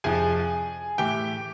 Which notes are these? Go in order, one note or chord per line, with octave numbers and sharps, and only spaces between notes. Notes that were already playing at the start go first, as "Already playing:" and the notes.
F2 C3 F3 G#4 G#5
A2 E3 G4 G5